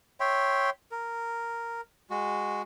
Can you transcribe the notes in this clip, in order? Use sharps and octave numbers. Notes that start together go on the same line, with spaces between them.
C#5 E5 G5 C6
A#4
G#3 F#4